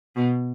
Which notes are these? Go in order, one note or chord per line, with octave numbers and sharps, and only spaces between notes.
B2